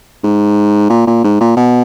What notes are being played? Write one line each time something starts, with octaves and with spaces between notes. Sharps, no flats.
G#2
A#2
A#2
G#2
A#2
B2